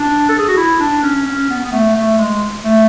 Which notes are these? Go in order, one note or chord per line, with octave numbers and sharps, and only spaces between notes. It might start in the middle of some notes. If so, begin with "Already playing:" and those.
Already playing: D4
A4
G#4
F#4
E4
D4
C#4
C#4
B3
B3
A3
A3
G#3
A3